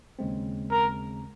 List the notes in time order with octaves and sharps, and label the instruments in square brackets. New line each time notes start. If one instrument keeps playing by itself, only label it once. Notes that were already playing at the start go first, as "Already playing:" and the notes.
[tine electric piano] D#2 C#3 G#3 C4
[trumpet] A#4